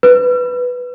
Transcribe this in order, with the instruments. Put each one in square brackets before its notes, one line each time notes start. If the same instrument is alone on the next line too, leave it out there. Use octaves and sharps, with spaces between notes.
[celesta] B4